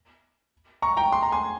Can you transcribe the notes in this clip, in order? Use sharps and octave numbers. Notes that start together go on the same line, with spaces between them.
A#5 C#6
G5 A#5
C6
A#5
G#5 C6